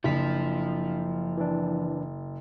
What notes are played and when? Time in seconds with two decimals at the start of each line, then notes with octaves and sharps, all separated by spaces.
0.04 F#1 F3 D4 B6
1.37 E3 D4